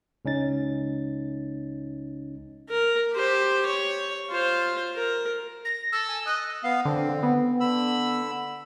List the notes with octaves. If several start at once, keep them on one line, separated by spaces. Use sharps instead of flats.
C#2 C#4 D#4 A6
A#4
G4 C5
C#5
F4 C5
A#4
A#6
A4 E6
G#5
D#5 F#6
B3 F5
D3 C4
B3
D3 B5 E6